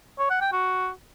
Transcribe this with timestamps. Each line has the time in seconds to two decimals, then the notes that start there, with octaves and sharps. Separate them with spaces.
0.19 C#5
0.30 F#5
0.41 G5
0.52 F#4